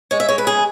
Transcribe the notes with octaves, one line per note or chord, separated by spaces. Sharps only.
G#3 C#5
E5
G#3 C#5
B4
C#3 G#4